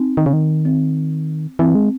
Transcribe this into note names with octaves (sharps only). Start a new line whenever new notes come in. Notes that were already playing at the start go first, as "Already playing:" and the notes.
Already playing: C4 D#4
D#3
C#3
D#3
C4
E3 C4
G#3